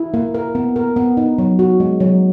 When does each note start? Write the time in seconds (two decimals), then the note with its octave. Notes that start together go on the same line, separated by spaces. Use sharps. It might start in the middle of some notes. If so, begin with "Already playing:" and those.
Already playing: E4
0.14 A#3
0.34 A#4
0.55 B3
0.76 A#4
0.96 B3
1.17 D#4
1.38 F#3
1.59 F#4
1.80 G#3
2.00 F#3